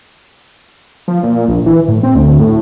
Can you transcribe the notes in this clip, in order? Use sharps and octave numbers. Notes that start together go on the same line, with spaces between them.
F3
A#2
A#1
E3
A2
C4
D2
A2